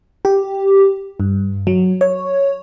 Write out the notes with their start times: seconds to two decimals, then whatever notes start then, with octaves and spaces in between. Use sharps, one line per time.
0.25 G4
1.20 G2
1.67 F#3
2.01 C#5